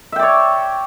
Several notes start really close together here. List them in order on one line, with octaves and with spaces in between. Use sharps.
E5 G5 D5 C#5